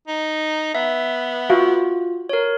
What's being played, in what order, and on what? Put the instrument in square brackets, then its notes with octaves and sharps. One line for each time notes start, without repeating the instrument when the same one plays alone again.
[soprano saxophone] D#4
[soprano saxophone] B3 [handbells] E5
[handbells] F4 [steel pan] F#4 E5 F5
[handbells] A#4 C#5